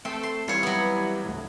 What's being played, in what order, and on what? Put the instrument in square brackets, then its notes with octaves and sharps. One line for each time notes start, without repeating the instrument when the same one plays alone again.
[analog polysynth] A3 A4 [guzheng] C4
[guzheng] C6
[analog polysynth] E3 G3 E4 [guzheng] F4 C#5
[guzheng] F#3 B3
[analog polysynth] D2 A2